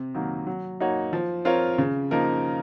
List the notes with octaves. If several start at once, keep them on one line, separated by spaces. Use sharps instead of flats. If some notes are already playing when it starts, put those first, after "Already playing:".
Already playing: C3
D#3 F#3 A#3
F#3
A#3 D#4 F#4 C#5
F3
C4 F4 A#4 C#5
C#3
F3 A#3 D#4 A#4